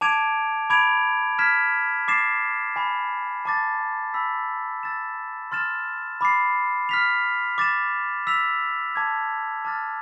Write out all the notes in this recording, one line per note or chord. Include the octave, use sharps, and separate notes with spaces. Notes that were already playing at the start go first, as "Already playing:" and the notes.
A5 D6 G#6 D7 F7
B5 D6 G#6 D7 F7
F6 G#6 B6 E7
D6 A6 C7 E7
G#5 B5 D6
A5 D6 A6
G#5 B5 E6 B6
E6 A6 E7
C6 F6 A6 E7
B5 D6 A6 C7
F6 B6 F7
D6 A6 E7
E6 B6 F7
A5 D6 G#6
A5 D6 F6 A6